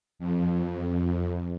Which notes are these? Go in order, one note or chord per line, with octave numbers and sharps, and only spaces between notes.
F2